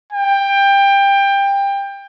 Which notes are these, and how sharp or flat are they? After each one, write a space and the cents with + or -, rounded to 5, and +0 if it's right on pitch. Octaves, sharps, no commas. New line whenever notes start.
G5 +20